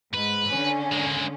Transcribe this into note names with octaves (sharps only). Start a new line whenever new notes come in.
G#2 B4
D3 C#4
G#3 A#3